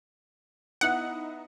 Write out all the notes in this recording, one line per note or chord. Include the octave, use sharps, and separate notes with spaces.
B3 D#4 E4 F#5